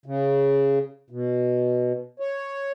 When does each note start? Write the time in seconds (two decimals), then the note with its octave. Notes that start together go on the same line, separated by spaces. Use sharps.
0.06 C#3
1.10 B2
2.20 C#5